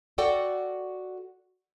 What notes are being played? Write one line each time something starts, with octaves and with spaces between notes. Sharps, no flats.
F#4 A4 D5 F#5 G5